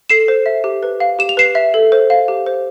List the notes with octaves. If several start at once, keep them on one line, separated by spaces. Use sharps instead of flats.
A4 C7 E7
C5
E5
G4
B4
F5
G4 E7
F7
B4 C7 E7
E5
A4
C5
F5
G4
C5